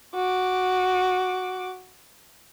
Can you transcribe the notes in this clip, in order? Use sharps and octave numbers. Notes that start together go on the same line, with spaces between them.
F#4 D6